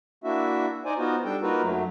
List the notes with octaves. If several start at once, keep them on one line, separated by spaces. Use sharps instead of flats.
A#3 D4 E4 F#4 E5
D#4 C5 D5 G#5
B3 D#4 F4 F#4 C5
G3 D4 A4 G5
A#3 D#4 F4 F#4 A#4 B4
F#2 F#3 A3